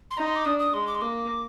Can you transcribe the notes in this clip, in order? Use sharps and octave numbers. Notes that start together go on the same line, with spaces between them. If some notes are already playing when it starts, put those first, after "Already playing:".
C6
D#4 A#5
C6
D6
D4 D#6
D#6
G#3 C6
D6
C6
A#3 D6